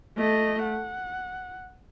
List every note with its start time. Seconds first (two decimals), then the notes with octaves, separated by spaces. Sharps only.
0.17 A3 D#5
0.63 F#5